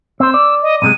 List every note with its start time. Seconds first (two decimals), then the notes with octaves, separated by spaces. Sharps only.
0.20 C4 C5 E6
0.34 D5
0.62 D#5
0.82 B1 C3 G#3 D#7